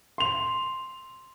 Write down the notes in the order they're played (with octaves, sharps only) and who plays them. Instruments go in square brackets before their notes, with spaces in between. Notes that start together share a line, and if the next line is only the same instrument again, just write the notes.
[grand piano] C6 F7